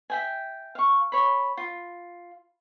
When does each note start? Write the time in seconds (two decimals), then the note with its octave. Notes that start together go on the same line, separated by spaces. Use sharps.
0.10 E5 G5 G#5
0.75 F5 C#6
1.12 C#5 B5
1.57 F4